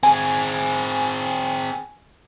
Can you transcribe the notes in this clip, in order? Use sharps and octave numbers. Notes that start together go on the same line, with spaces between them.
C4 G#4 G#5